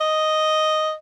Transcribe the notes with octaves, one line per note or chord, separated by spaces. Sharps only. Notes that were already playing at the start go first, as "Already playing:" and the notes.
D#5